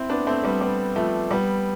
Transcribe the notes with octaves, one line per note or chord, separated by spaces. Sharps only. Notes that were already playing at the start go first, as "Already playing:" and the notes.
Already playing: C4 E4
B3 D4
A3 C4
G3 B3
G3 B3
F3 A3
G3 B3